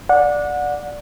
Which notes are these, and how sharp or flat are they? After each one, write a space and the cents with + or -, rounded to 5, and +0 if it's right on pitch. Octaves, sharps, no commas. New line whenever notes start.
D5 +0 F#5 -25